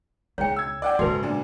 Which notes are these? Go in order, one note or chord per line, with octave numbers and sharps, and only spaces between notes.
C#2 G#2 C#5 G5
E6 G#6
D5 F#5 G5
A#1 G#2 C#3 F#4 A4 B4
G#1 A#2 D4